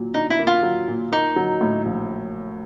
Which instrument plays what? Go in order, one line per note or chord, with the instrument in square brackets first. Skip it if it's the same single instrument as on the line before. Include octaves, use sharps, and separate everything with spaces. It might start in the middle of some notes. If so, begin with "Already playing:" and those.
Already playing: [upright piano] A#2 F#3
[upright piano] D4 [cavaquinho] D#4
[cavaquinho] E4
[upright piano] A#3
[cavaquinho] F4
[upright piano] F#3
A#2
[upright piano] A#3 [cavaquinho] D#4
[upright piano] F#3
A2
A#1